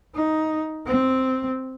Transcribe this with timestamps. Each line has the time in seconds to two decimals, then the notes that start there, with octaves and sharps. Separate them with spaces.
0.14 D#4
0.86 C4